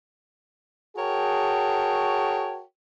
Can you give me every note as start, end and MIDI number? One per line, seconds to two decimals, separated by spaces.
0.97 2.63 66
0.97 2.63 68
0.97 2.63 70
0.97 2.63 73
0.97 2.63 79
0.97 2.63 81